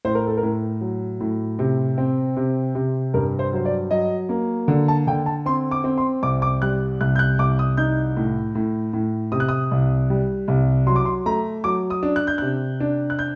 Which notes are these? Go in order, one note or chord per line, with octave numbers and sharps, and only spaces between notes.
A2 C5
A#4
A4
A#4
A2
F#3
A2
C3
C4
C3
C3
G2 A#4
C5
F#3 C5
D5
F#3 D#5
A#3
D3
A5
D3 G5
A5
C4 C6
D6
C4
C6
C2 D6
D6
G3 F#6
C2 F#6
G6
F#6
C2 D6
D#6
D#4 G6
A2
A2
A2
C3 D#6
F#6
D#6
C2
G3
C2
F#3 C6
D6
C6
A3 A#5
F#3 D6
D#6
D4
F#6
G6
C3 F#6
D4
F#6
G6